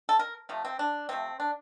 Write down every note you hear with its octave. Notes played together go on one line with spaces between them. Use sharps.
A4
A#4
C3 F3 A3
C4
D4
C3 F3 A3 C4
D4